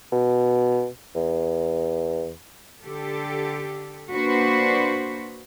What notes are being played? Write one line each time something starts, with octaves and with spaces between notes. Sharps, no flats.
B2
E2
D3 G4 A4
A#3 D4 F#4 B4 C5